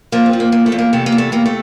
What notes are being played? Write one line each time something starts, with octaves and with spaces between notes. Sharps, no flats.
F3 A#3
C4
F3
A#3
E2 A#3
A3
E2
A#3
C3 A3
A#3
E2
A3
C3 A#3
A3